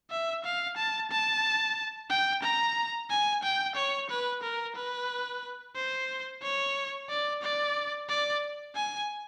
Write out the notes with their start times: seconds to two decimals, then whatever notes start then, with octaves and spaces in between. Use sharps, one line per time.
0.11 E5
0.44 F5
0.77 A5
1.11 A5
2.10 G5
2.43 A#5
3.10 G#5
3.43 G5
3.76 C#5
4.10 B4
4.43 A#4
4.76 B4
5.75 C5
6.43 C#5
7.09 D5
7.42 D5
8.09 D5
8.76 G#5